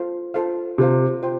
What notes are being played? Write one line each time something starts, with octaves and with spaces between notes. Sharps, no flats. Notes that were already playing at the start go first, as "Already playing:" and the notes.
Already playing: F4 A4 C5 F5
F4 A4 C5 F5
C3 F4 A4 C5 F5
F4 C5 G5